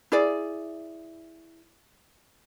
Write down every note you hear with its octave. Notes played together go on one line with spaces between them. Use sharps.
E4 G#4 D5